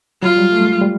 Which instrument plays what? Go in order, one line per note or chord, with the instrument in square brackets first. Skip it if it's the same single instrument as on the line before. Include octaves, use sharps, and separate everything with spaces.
[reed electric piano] F#3 [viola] F4
[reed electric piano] G3
A3
G#3
G3